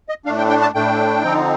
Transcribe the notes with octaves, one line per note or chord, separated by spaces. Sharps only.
D#5
A2 A3 D4 F5
G5
G5
A5
A2 A3 D4 G5
D3 F3 C4 D#4